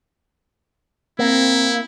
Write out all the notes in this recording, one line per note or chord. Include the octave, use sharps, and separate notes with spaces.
A#3 C4 E4